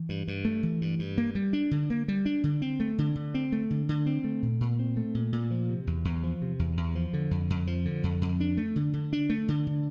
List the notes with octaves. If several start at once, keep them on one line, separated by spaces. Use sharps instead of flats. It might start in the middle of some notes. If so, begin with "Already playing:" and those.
Already playing: E3
G2
G2
A3
E3
G2
G2
A#3
G3
D4
D3
A#3
G3
D4
D3
C4
A3
D3
D3
C4
A3
D3
D3
C4
A3
A#2
A#2
C4
A3
A#2
A#2
F3
C3
E2
E2
F3
C3
E2
E2
F3
D3
F2
F2
F3
D3
F2
F2
D4
A3
D3
D3
D4
A3
D3
D3